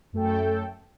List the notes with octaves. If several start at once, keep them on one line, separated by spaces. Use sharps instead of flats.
F#2 A3 A4 G5